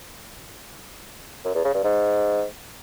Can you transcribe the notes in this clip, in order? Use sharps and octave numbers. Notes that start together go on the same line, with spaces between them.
F#2
E2
C#3
G2
G#2